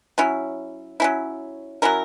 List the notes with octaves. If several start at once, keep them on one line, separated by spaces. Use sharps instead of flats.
F#3 C#4 E4
F#3 C#4 E4
F#3 C#4 E4 A#4